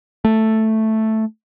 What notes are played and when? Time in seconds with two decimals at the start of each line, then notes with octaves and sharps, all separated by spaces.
0.25 A3